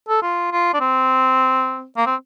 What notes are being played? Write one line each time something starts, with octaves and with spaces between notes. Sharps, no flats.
A4
F4
F4
D4
C4
A#3
C4